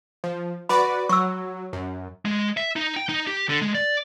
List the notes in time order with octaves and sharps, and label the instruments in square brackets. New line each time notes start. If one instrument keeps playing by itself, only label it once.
[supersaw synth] F3
[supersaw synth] F#4 B4 D5 [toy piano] B5
[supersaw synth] F#3 [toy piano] C#6 E6
[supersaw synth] F#2
[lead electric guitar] G#3
E5
D#4
G5
D#4
G4
D3
G#3
D5